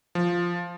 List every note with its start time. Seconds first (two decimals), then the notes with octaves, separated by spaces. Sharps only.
0.15 F3